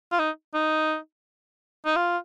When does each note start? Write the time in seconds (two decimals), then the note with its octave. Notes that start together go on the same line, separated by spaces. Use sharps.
0.12 F4
0.19 D#4
0.54 D#4
1.86 D#4
1.96 F4